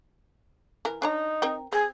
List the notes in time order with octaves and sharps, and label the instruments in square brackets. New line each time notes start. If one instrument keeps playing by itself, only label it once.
[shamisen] E3 A#4
[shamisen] D4 C#5 A#5 [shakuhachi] D#4
[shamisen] C4 A#4 G5
[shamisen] C4 [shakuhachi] G#4